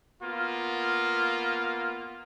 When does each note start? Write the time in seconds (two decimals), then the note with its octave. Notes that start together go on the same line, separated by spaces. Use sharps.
0.23 A#3 B3 F4